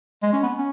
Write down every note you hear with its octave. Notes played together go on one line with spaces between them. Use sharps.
G#3
C#4
B3
C#4